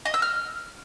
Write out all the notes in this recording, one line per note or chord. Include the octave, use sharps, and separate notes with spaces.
D#5
E6
F6